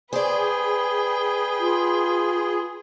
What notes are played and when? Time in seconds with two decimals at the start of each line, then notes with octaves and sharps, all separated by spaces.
0.13 G#4 B4 C5 D5 G5
1.60 F4